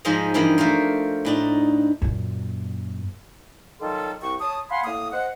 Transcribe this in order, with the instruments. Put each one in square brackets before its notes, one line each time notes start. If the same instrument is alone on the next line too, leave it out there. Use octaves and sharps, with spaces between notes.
[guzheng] G#2 F3 G#3 C5 D#5 A#5
G2 E3 F3 A#3 D#5
A3 A#3 A#4 C5
A2 D4 D#4
[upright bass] F#2 A#2
[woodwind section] D#3 F#3 G3 F4 A4
C2 G5 C#6
C#5 A5 D#6
F5 F#5 G#5 B5 C6
A2 A#3 D#6
C5 D#5 F#5